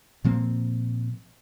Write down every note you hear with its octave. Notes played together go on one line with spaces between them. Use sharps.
A#2 F3 A#3 C4